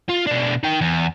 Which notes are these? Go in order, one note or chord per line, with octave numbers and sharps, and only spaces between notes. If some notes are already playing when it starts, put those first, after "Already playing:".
F4
B2 D4
D#4 G5
E2